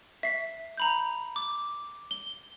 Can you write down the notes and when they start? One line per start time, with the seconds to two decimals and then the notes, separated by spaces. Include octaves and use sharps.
0.23 E5 C7
0.77 A#5 B5 G6
1.36 D6
2.11 G7